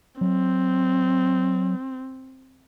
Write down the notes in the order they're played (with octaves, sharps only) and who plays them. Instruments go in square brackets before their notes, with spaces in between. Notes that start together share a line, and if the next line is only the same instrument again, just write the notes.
[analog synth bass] F#3 [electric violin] C4